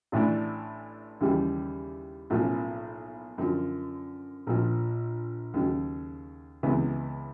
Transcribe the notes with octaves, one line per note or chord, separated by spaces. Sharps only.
A1 A2 E3 A3 D4
D#2 C#3 E3 G3
B1 A2 F3 A#3 C#4
F#2 D3 F3
A#1 A#2 F3
D#2 C#3 F#3
C#2 C3 E3 G#3 B3